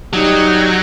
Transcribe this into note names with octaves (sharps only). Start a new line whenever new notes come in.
F#3 G3 D#4